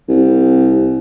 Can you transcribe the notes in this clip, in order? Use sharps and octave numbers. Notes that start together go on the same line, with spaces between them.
C2